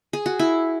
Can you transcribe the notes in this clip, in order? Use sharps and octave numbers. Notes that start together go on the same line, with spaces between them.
G#4
F#4
E4